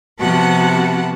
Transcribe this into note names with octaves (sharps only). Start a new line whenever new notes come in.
C3 F3 B3 F#4 F#5 A5